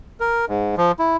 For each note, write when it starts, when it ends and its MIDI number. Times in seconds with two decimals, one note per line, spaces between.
0.20 0.45 70
0.48 0.75 44
0.77 0.92 53
0.99 1.17 64